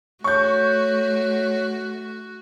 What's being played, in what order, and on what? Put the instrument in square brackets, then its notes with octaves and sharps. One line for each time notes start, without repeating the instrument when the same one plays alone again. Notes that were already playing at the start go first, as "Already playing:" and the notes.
[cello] A3 [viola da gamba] F#4 [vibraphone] C#5 [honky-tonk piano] C#6 G6